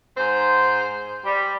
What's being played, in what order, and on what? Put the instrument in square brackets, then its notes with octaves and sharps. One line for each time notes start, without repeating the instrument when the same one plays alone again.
[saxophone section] G#2 C5
G3